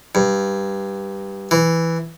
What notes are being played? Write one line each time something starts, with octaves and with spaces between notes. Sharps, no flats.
G2
E3